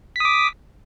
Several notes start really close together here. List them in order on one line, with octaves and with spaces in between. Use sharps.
B6 D#6 D6